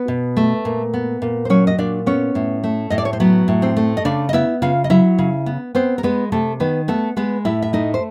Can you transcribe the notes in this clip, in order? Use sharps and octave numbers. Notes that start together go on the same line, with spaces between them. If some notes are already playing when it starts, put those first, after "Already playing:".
Already playing: B3 B4
B2
A3
A#2
B3
A#2
C5
F#3 C#4 C#5
D#5
A#2 D4 D5
B3 C#4 C#5
A2
A3
A2 D#5
D5
C#5
C5
F#3 B3 B4
A2
C4 C5
A3
D#5
C#3 D4 D5
D#5
B3 E4 E5
C#3 F4 F5
D#5
F#3 E4 E5
C#3
B3
B3 C4 C5
A#4
G#3 B3 B4
C3 A3 A4
D#3 B3 B4
A3 B3 A4
G#3 B3 B4
A2 E4 E5
E5
A3 D#4 D#5
C5